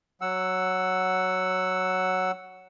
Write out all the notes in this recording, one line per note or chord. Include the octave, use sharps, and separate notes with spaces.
F#3 F#5 E6